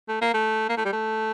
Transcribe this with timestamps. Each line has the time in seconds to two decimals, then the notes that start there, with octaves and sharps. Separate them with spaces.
0.08 A3
0.21 A#3
0.34 A3
0.69 A#3
0.77 A3
0.85 G3
0.93 A3